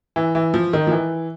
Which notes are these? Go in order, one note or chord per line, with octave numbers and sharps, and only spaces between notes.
E3
E3
F3
D#3
F3
E3